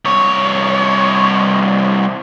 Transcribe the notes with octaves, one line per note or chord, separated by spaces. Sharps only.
C2 C#5